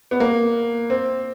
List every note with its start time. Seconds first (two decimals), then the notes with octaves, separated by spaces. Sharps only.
0.11 B3
0.20 A#3
0.90 C4